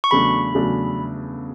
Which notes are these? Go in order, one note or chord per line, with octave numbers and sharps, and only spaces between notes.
C#6
E2 C#3 F#3 A3 D4 B5
E2 C#3 F#3 A3 D4